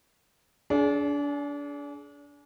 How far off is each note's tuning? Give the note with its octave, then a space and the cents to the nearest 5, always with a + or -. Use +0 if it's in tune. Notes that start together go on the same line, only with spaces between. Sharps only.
D4 -30 G#4 +25